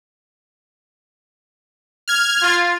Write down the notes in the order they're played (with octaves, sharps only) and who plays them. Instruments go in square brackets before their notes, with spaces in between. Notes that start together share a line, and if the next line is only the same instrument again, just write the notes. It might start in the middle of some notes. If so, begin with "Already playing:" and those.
[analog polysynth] F6 G#6
[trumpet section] F4